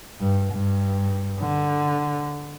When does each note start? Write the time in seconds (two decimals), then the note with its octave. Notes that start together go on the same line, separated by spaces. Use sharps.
0.20 G2
0.53 G2
1.40 D3